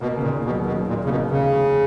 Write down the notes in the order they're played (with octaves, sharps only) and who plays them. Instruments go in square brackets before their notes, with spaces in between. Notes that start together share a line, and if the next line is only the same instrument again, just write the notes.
[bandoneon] B2 [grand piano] A#3
[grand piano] C#3
[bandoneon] A#2
[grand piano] D#2
[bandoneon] B2
[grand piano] F#3
[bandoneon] B2 [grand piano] F#3
[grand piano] D#2 [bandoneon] A#2
[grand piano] A#3
[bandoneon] C#3
B2
[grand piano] D#2
[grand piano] F1 [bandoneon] C#3
[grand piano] F2